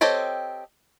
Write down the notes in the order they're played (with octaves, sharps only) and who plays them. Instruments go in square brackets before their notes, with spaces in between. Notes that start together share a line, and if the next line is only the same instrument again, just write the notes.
[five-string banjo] C4 G4 A4 C#5 D#5